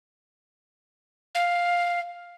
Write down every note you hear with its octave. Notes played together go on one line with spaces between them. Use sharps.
F5